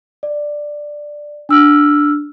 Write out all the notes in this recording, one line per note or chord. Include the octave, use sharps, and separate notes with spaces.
D5
D4 E6 F6